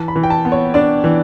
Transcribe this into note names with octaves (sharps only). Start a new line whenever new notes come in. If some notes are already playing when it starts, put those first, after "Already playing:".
Already playing: E3 A5
B5
E3
G5
A5
B3
C#5
D4 D5
E3